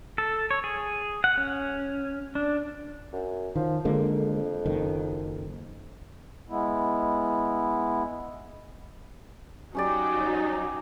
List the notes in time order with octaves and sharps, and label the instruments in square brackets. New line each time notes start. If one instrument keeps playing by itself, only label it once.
[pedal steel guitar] A4
C#5
G#4
F#5
C#4
D4
[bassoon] F#2
[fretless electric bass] D#3 [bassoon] F3
[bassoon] F2 [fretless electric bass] D3 G#3 A#3
[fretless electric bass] F#1 D#3
[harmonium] G#3 B3 E4
[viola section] F#3 D#4 [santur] C#4 G4 D5